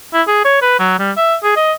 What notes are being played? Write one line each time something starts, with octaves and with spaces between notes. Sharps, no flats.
E4
G#4
C#5
B4
F#3
G3
E5
G#4
D#5